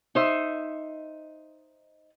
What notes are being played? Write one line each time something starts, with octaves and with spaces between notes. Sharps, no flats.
D#4 C5 E5